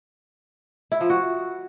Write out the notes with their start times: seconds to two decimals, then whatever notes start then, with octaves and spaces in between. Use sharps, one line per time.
0.92 E4
1.01 F3
1.10 F#4